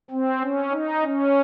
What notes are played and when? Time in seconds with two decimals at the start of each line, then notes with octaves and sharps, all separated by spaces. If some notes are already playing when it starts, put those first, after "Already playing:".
0.11 C4
0.41 C#4
0.72 D#4
1.03 C#4